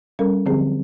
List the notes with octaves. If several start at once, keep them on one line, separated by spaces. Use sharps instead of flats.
G3 C#4 A4 A#4
D3 F3 F#3 C4 G4 G#4